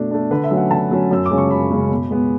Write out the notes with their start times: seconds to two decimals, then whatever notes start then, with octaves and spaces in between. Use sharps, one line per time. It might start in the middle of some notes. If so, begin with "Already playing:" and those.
Already playing: B2 A3 D4
0.11 A3 D4
0.31 D3 B4
0.44 E5
0.51 F#3 A3 C#4
0.57 F#5
0.71 D3 A5
0.91 F#3 A3 C#4
1.11 F#2 E6
1.26 D6
1.31 C#3 G#3 C#4
1.38 C#6
1.51 F#2 B5
1.71 C#3 G#3 C#4
1.90 B2
2.10 G#3 B3